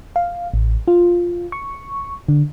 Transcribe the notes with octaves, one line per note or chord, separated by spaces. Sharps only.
F5
A1
F4
C#6
D3